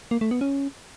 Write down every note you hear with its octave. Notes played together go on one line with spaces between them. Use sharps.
A#3
A3
B3
C#4